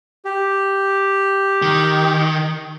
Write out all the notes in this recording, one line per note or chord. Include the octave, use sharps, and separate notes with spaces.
G4
D#3